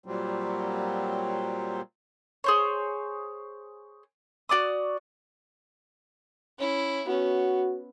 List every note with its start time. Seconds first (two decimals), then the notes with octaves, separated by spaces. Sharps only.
0.06 A#2 F#3 G3 C4
2.44 G#4 C5 C#5
4.49 F#4 D5 D6 D#6
6.58 C#4 E4
7.07 B3 C#4 F#4